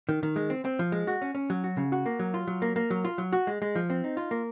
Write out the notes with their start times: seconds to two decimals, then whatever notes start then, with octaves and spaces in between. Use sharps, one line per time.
0.09 D#3
0.23 D#3
0.36 G#3
0.50 C4
0.65 C4
0.79 F3
0.92 G#3
1.07 F#4
1.22 C#4
1.35 C#4
1.50 F#3
1.64 F#4
1.77 C#3
1.92 F#4
2.06 A#3
2.20 F#3
2.34 F4
2.47 F#3
2.62 A#3
2.76 A#3
2.90 F#3
3.05 F4
3.18 F#3
3.33 F#4
3.47 G#3
3.62 G#3
3.75 F3
3.90 C4
4.04 D#4
4.17 F4
4.31 A#3